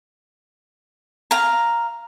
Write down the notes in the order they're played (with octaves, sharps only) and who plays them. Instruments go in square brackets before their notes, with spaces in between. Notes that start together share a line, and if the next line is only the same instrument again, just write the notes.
[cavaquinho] F5 A#5